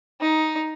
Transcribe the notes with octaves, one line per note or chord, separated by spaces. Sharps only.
D#4